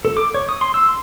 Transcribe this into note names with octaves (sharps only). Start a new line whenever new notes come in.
A4
D6
C#5
D#6
C6
E6
C6